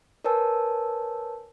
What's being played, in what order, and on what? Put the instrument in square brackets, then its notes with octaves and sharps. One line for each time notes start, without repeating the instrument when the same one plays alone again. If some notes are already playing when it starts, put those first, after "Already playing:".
[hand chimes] A#4 B4 C#5 G#5 A5 E6